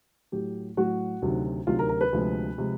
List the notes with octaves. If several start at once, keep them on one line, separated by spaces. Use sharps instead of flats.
A2 F#3 G4
A2 F#3 F#4
D2 C3 D#3 F#3
D2 C3 D#3 F#3 F4
A#4
A#4
B4
D2 C3 F3 G#3
C3 F3 G#3